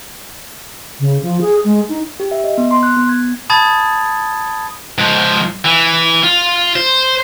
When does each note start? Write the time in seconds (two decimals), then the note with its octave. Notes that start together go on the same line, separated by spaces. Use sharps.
1.00 C#3
1.23 F3
1.41 G#4
1.64 G#3
1.89 D#4
2.20 G4
2.31 E5
2.44 D#5
2.58 B3
2.71 C6
2.83 F#6
2.97 B3
3.09 G#6
3.50 A5 B5 D#6 G#6 A6
4.98 G#2 F3
5.65 E3
6.23 F4
6.76 C5